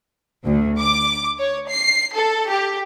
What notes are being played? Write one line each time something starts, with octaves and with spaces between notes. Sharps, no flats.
D2
D6
C#5
C7
A4
G4